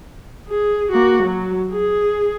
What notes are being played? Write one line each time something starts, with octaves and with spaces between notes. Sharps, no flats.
G#4
A#3 F#4
F#3
G#4